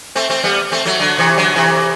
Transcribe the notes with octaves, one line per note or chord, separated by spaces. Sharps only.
A3 C4
A3 C4
G3 B3
A3 C4
F#3 A3
D3 F#3
C3 E3
D3 F#3
C3 E3